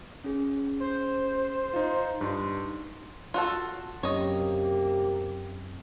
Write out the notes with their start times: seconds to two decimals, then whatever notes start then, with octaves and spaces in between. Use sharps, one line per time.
0.24 C#4 G#4
0.80 C5
1.73 D#4 F4
2.21 G2 D#4 C6
3.34 F4 F#4 A4
4.03 F#2 C3 A#3 C4 G4 C#5 D#5